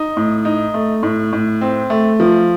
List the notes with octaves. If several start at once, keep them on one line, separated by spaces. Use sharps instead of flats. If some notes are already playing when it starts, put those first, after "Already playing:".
Already playing: D#4
A2
D#4
A3
A2
A2
C4
A3
F3